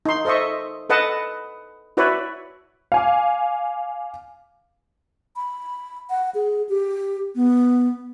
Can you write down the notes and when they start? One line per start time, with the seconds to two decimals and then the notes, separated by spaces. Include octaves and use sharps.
0.06 D#4 C6
0.25 A4 C5 D#5 E5 C#6
0.90 A4 B4 D#5 F#5 A5
1.97 E4 F#4 B4 C#5 D5 E5
2.92 F5 G#5 D6
5.36 B5
6.10 F#5
6.35 G#4
6.69 G4
7.35 B3